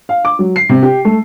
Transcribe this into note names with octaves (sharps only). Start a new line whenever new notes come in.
F5
D6
F#3
C7
C3
G4
A3